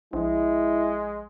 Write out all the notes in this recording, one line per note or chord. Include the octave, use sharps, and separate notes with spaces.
A#1 G#3 E4